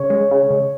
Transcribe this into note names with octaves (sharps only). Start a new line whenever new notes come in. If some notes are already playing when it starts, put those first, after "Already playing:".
Already playing: C#3 C#5
G#3
C#3
C#3